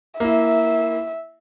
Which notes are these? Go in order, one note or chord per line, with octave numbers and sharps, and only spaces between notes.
A#3 E4 E5